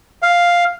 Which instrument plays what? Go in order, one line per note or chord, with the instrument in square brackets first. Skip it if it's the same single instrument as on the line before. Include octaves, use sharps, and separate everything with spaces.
[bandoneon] F5